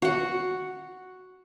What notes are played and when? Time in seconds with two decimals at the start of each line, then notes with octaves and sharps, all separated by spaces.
0.02 F#4 F#5